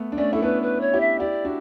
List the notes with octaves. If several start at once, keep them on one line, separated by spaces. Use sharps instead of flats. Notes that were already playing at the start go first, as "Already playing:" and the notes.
Already playing: A3 B3
D4
A3 C#4 D5
E4 A4
B3 D4 B4
B4
C#5
E4 G4
E5
E4 G4 D5
D4 F#4